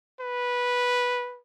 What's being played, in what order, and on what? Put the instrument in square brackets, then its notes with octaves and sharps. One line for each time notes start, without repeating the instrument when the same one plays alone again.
[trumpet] B4